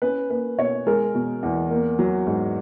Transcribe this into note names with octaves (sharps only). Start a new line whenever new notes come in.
C#4 B4
A#3 B4
B2 C#5
G#3 A#4
B2
E2
A#3
F#3
G#2